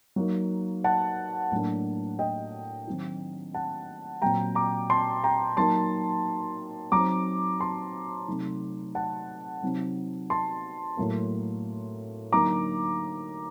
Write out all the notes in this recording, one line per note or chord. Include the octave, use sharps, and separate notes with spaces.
F#3 A#3 D#4
F#5 A5
A2 F#3 A#3 D4
D#5 G5
D#3 F#3 C4 D#4
F#5 A5
A#2 F#3 C4 G5 A#5
A#5 D6
A5 C6
G5 A#5
F#3 A#3 D#4 A5 C6
F#3 C4 D#4 A#5 D6
A5 C6
C3 F#3 A3 D#4
F#5 A5
C3 F#3 C4 D#4
A5 C6
A2 F#3 A#3
D3 F#3 A#3 D#4 A#5 D6